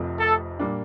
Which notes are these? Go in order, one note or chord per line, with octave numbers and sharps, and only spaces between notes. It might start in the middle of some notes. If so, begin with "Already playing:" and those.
Already playing: F1 F2 C3 F3 A3
A4
A#2 G3 A#3 D4